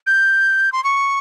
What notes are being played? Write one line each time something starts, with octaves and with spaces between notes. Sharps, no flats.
G6
C6
C#6